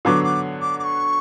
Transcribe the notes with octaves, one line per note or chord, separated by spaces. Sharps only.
D3 F#3 B3 D6
D6
D6
D6
C#6